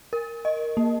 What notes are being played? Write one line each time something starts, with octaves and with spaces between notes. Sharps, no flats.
A#4
D#5
A#3